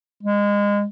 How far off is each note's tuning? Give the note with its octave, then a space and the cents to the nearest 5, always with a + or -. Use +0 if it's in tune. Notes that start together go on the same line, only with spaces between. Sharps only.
G#3 -25